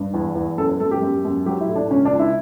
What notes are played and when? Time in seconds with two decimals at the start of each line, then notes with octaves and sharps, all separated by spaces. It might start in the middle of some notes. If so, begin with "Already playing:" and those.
Already playing: G2
0.14 E2
0.35 E2
0.58 F#2 A4
0.69 B4
0.80 F#2 A4
0.91 G4
1.01 F#2
1.25 F#2
1.46 F#3 G4
1.61 E4
1.69 A2
1.76 D4
1.90 C#2 C#4
2.05 D4
2.12 C#2
2.19 E4